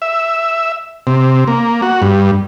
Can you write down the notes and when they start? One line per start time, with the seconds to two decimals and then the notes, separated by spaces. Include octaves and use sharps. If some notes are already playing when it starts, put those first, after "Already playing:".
0.02 E5
1.07 C3
1.48 A#3
1.82 F#4
2.02 G2